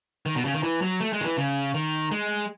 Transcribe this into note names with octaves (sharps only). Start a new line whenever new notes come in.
D#3
B2
C#3
D#3
E3
F#3
A3
G#3
D#3
E3
C#3
D#3
G#3